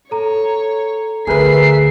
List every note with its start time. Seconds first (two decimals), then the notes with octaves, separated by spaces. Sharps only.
0.11 A4 C#5 A#5
1.27 D2 D3 G#4 A#4 B4 E5 C7